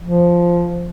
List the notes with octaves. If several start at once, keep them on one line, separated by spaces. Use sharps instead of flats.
F3